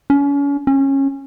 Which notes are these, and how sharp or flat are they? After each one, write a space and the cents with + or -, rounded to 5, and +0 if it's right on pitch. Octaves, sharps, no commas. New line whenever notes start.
C#4 +35
C#4 -20